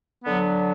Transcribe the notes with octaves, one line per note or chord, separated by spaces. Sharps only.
D3 F#3 B3